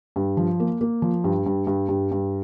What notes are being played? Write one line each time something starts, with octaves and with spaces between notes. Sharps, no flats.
G2
F3
A#3
A#3
F3
G2
G2
G2
G2
G2